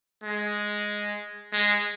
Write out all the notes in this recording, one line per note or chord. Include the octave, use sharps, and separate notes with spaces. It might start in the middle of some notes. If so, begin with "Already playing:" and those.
G#3
G#3